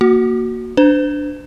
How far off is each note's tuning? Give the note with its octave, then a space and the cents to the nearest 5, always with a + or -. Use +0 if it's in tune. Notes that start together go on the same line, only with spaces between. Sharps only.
A#3 +0 F#4 +0
D4 +0 C5 -40